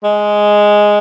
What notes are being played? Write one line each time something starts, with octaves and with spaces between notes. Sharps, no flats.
G#3